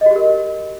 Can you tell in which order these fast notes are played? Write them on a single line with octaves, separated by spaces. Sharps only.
D#5 F#4 G4 A#4